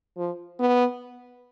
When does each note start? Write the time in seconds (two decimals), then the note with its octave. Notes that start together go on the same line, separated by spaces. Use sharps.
0.18 F3
0.60 B3